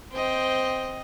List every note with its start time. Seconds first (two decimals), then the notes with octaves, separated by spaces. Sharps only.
0.13 C4 C5 D#5 G5